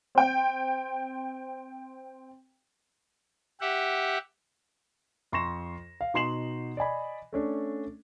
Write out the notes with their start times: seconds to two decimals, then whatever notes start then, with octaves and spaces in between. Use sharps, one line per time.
0.15 C4 G5
3.61 G4 E5 F#5
5.32 F2 C6 C#6 A#6 E7
6.01 F5
6.14 B2 D#4 C6 C7 E7 F#7
6.77 D5 D#5 G#5 B5
7.33 A3 C#4 D4